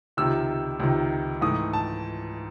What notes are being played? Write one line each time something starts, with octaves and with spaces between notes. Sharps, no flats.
C#2 C3 D#3 E6
C#2 C3 D#3
G#2 E3 A3 D#6
A5